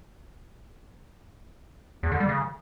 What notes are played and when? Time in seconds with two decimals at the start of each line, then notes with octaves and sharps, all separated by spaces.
2.03 E2
2.12 D3
2.20 G3
2.29 C#3